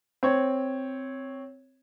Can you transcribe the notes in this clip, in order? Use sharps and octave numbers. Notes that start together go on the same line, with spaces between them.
C4 C#5